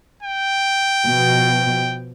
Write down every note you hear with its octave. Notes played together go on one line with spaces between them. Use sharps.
G5
B2 F3